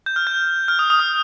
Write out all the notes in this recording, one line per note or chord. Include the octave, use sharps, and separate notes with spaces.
G6
F6
G6
F6
D#6
D#6
F6